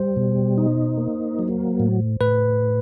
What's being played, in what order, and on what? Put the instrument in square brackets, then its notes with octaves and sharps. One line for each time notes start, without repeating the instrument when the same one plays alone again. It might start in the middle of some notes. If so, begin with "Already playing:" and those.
Already playing: [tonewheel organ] G3 [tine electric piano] C5
[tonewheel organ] B2
D#4
A#3
F#3
A2
[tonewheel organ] A2 [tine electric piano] B4